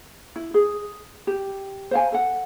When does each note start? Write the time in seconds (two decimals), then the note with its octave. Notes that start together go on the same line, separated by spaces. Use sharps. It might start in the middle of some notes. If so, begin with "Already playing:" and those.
0.36 E4
0.54 G#4
1.27 G4
1.91 C5 F5 G#5
2.12 A4 F#5